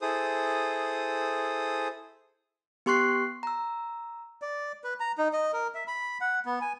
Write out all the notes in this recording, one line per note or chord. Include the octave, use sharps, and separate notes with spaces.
E4 G#4 A4 C5 D#6
B3 G4 C6 C#6 F#6 C7
A#5 E6
D5
B4
A#5
D#4
D#5
A#4
E5
B5
F#5
B3
G#5